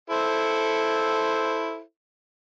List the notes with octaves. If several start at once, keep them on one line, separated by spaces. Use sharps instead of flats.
E4 A4 C5